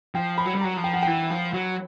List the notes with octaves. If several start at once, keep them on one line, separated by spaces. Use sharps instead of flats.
F3 G5
B5
F#3
G3
F#3 A#5
F3
G5
F#5
E3 G5
F3
F#3